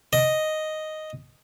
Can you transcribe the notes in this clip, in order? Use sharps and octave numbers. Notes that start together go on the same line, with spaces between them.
D#5